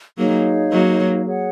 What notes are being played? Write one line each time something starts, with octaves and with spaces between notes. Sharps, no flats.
F#3 A#3 D#4 G#4 C#5 F5
F#3 A#3
G#4 C#5 F#5